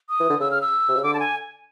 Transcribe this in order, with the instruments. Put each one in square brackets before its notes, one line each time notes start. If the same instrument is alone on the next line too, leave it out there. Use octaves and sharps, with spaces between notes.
[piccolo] D#6
[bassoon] E3
D3
[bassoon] C#3 [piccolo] E6
[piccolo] F6
E6
[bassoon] C3
C#3
[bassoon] D3 [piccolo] D6
[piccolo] A5
G#5